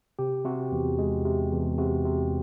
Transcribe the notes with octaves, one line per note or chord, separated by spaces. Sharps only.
C3 G4
C3 F#4
E2
G#3
C3
E2
C3 F#4
C3